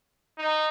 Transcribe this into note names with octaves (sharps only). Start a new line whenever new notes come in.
D#4